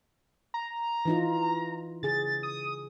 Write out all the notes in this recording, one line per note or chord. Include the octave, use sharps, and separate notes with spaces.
A#5
E3 D#4 F4
C#3 G#4 A6
D#6